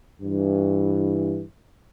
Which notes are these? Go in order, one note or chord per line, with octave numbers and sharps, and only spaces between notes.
G2 E3